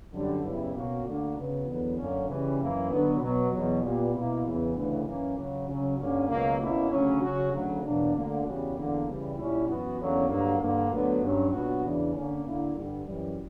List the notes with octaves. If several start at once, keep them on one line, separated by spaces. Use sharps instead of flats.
F#2 D3 G3
F#2 C#3 G3 B3 E4
B2 A#3 C#4 F#4
D2 D3 A#3 D4 F#4
C#3 F#3 B3
E2 D3 F#3 B3
F#2 D3 A#3 C#4
C#3 E3 G3 C#4
F#2 E3 A#3 E4
D3 F#3 B3
B2 F#3 B3
E2 B2 F#3
A#2 G3 B3
B2 A#3 E4
E2 C#3 E3 B3
D2 C#3 E3
F#2 E3 A#3 C#4
C#2 C#3 F#3
C#3 F#3 C#4
G2 D3 A#3 C#4
C#2 B2 F#3 A#3
B2 A#3 C#4 E4
D2 C#3 F#3 C#4
C#3 F#3 C#4 F#4
D2 C#3 F#3
E2 B2 F#3 A#3 D4
D2 D3 A#3
E2 C#3 G3 C#4 F#4
E2 D3 A#3
C#3 E3 G3
A#2 G3 C#4 E4
F#2 E3 B3 F#4
E2 D3 F#3 A#3 C#4
G2 D3 F#3 A#3
G2 D3 A#3
D2 D3 F#3 B3
G2 F#3 C#4
A#2 F#3 B3 D4 F#4
E2 C#3 E3 B3 D4
D3 A#3 C#4
D3 A#3 E4
G2 D3 G3
F#2 E3 G3